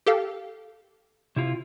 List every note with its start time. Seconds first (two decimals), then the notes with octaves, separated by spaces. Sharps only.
0.06 G4 A4 F5
1.36 C3 E4 F4